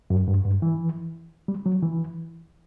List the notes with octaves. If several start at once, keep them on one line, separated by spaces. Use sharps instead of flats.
F#2
G2
G2
E3
G3
F#3
E3